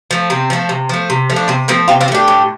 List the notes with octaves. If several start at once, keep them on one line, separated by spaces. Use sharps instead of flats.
F3 A3
C3 C4
F3 A3
C3
F3 A3
C3
F3 A3
D4
C3 C4
F3 A3 C4
C3 C4 F4
C4 F4
F3
A3 D4 G4
A2